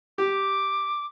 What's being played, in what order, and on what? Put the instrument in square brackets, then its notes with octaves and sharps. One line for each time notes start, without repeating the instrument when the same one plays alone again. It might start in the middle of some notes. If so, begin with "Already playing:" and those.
[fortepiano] G4 [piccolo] D6